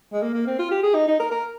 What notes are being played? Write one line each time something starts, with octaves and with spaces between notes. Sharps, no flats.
G#3
A#3
A#3
C4
F4
G4
G#4
D#4
D#4
A#4
A#4